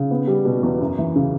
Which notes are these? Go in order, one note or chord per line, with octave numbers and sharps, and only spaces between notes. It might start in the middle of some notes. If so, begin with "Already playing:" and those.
Already playing: C#3
B3
G3
B2
E2
F#2
E3
C#3